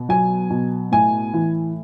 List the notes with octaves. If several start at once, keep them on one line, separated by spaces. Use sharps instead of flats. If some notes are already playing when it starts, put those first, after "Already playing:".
Already playing: B2
F#3 G#5
B2
A2 G#5
E3